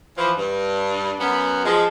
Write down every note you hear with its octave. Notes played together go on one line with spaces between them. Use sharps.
E3 F3
G2
F#2 B3
F3 G#3